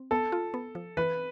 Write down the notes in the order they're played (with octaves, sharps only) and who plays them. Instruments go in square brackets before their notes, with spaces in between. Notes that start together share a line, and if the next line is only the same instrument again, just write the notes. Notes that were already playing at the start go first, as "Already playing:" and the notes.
Already playing: [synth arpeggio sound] C4
[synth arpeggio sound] B3 [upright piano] A4
[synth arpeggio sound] F4
B3
F3
[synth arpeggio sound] E3 [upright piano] B4